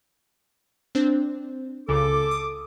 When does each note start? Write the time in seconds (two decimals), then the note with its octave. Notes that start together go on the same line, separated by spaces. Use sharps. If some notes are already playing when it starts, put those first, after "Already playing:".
0.95 C4 D4 C5
1.89 C#2 C#3 A4 D6
2.31 D#6